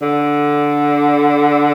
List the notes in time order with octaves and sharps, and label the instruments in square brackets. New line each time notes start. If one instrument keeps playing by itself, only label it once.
[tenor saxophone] D3